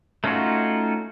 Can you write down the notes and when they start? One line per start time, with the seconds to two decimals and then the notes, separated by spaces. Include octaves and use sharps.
0.24 A3 C#4 D#4 F4 F#4